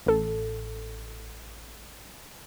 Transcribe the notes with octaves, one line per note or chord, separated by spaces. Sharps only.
A1 A4